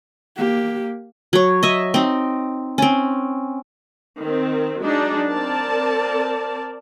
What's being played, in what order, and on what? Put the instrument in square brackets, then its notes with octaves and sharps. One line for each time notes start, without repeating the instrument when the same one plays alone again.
[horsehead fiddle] A#3 G4
[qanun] F#3 C#5
D#5 E5
C4 D#4
C4 C#4
[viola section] D#3 C4
F#3 G#3 D4 D#4
C4 A#4 D5 A5